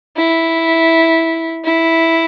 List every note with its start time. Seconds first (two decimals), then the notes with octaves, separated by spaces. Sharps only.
0.17 E4
1.65 E4